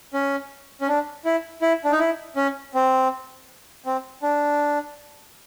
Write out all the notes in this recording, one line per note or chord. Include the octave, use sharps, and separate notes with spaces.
C#4
C#4
D4
E4
E4
D4
D#4
E4
C#4
C4
C4
D4